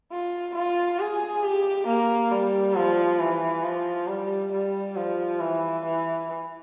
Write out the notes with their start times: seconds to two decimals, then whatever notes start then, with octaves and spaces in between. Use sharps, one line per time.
0.11 F4
0.55 F4
0.99 G#4
1.43 G4
1.87 A#3
2.31 G3
2.75 F3
3.19 E3
3.64 F3
4.07 G3
4.52 G3
4.96 F3
5.40 E3
5.85 E3